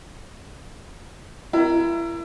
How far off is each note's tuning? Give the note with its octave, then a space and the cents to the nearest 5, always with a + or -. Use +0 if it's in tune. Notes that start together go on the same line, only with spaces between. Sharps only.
E4 +30 A#4 +5